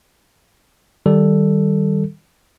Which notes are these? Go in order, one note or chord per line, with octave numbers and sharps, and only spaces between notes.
D#3 G3 A4